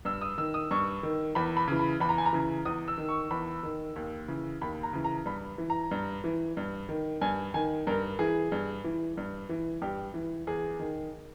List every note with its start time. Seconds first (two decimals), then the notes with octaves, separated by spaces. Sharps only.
0.05 G2 E6
0.21 D#6
0.38 D#3 E6
0.54 D#6
0.71 G2 C#6
1.03 D#3
1.35 E2 B5
1.57 B5
1.68 C#3 E3
1.79 B5
2.00 E2 B5
2.09 A#5
2.18 G#5
2.26 A#5
2.33 C#3 E3
2.65 E2 D#6
2.88 E6
2.98 D#3
3.09 C#6
3.31 E2 B5
3.63 D#3
3.96 D#2
4.28 C#3 E3
4.61 D#2 B5
4.83 A#5
4.93 C#3 E3
5.04 A#5
5.26 G2 B5
5.58 E3
5.70 A#5
5.91 G2
6.24 E3
6.57 G2
6.89 D#3
7.21 G2 G#5
7.54 D#3 G#5
7.87 G2 A#4
8.19 E3 G#4
8.52 G2
8.84 E3
9.17 G2
9.49 E3
9.82 G2 G4
10.14 E3
10.47 E2 G#4
10.80 D#3